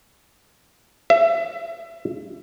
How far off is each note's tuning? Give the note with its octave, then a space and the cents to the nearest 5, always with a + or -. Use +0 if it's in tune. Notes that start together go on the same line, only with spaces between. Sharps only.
E5 +25